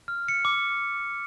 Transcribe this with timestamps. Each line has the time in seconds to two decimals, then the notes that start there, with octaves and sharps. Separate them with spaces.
0.08 F6
0.28 C#7
0.45 D6